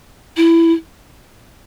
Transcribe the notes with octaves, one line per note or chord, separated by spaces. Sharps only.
E4